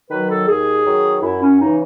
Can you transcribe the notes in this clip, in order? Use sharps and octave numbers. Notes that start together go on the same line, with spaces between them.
D#3 F#3 B4
A4
D#2 G#4
D#3 F#3
F#2 E4
C#4
C#3 E3 D#4